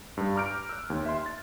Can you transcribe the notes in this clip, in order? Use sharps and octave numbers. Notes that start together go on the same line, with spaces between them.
G2
A#5 D6 F6 G6 D7
E6 F#6
D#2
E5 C6
A6